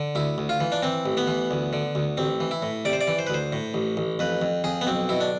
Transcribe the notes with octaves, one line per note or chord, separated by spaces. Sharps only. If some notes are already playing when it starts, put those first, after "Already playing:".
Already playing: D3
D2 E4
D2
F4
E3
D4
E3 C4
A1
B3
E3
D2
D3
D2
A1 C4
E3
E4
A2
C3 D5
C5
D5
E3
C5
B4
D2 C5
A2
A1
A1
F2 B4
F2
F2 G#4
B3
B1 C4
B2 E4
D4